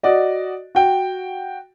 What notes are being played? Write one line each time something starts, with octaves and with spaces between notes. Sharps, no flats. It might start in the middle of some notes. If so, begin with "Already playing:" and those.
F#4 D5 D#5
F#4 G5